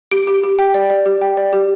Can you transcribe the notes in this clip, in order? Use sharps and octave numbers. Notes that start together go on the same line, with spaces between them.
G4 D7
G4
G4
G5
D5
D5
G4
G5
D5
G4